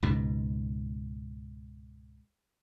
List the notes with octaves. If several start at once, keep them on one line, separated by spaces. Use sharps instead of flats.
C#2 G#2 B2